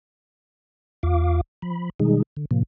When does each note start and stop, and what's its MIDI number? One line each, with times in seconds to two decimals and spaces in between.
1.03 1.41 40
1.03 1.41 65
1.03 1.41 77
1.03 1.41 86
1.62 1.90 53
1.62 1.90 83
2.00 2.22 47
2.00 2.22 51
2.00 2.22 55
2.00 2.22 56
2.00 2.22 63
2.00 2.22 68
2.37 2.45 50
2.51 2.63 45
2.51 2.63 48
2.51 2.63 53
2.51 2.63 58